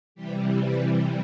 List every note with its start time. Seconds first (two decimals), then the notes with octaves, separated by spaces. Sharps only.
0.15 C3 E3 G3 G4
0.62 B4